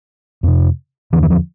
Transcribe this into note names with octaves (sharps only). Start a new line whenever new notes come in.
F2 C3
E2 D3 E3
E3
F3